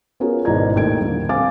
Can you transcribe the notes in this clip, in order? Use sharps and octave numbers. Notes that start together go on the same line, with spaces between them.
B3 C#4 F4 F#4 G#4 A#4
G#1 B2 E4 D5 A#5 G#6
D#2 A2 D#4 G#6 D7
A#2 D3 F3 G3
C4 F5 G#5 D6 A6